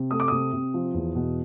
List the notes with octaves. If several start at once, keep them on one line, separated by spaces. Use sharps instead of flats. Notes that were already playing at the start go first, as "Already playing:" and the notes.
Already playing: C3
A3 D#6
D6
C3 D#6
C3
F3
E2
B2